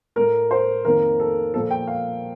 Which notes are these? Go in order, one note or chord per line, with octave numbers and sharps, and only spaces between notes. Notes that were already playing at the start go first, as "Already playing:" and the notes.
A2 A3 A#4
C5
F2 D#3 A#3 A#4
A4
A#2 F3 A#3 A4
G5
F5